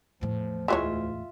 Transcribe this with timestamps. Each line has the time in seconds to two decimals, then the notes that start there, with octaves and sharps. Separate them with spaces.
0.21 E2 A2 F3
0.68 D2 E3 G#3 F4 C#5 E5